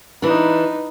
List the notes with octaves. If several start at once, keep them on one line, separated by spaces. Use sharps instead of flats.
E3 D4 D#4 B4